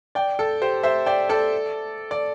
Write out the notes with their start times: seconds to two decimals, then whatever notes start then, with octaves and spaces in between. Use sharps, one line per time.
0.15 D5 G5
0.39 A4
0.61 G4 C5
0.83 C5 E5
1.06 D5 G5
1.29 A4 D5
2.11 D5